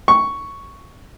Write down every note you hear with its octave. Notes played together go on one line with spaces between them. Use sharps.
C#6